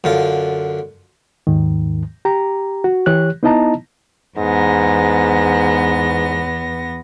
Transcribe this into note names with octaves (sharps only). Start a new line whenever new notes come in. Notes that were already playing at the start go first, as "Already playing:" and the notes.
F#2 D3 F4
D#2 G#2 D#3
G4 A#5
F#4
E3 G4 C#5 F#6
B3 D#4 E4 D#5 A5 A#5
E2 G#2 B3 A#6